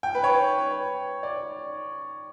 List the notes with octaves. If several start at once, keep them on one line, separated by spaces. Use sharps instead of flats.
G5
B4
C#5
D5